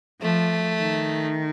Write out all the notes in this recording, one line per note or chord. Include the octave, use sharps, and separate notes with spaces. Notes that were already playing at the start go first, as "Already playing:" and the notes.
F3 A3
D#3